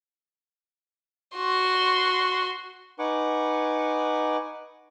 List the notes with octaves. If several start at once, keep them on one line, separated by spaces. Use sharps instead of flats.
F#4 C6
D#4 B4 F#5 G#5 C#6 D6